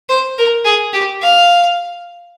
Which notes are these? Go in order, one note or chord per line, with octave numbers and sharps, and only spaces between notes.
C5
A#4
G#4
G4
F5